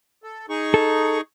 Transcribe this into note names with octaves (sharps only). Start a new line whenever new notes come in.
A4
D#4 G#4 C#6
A4